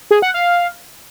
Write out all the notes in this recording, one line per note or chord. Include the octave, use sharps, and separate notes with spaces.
G#4
F#5
F5